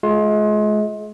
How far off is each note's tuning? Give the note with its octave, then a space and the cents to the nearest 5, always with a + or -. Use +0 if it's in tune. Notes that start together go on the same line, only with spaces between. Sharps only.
G#3 +35 F4 +15